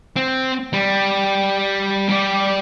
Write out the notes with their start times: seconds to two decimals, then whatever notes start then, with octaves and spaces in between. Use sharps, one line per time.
0.16 C4
0.73 G3
2.09 G3 D5